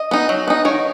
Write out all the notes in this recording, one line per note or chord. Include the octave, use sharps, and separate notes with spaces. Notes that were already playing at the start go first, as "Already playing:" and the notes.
Already playing: D#5
B3 D#4
F#3
B3 D#4
D#3 C#5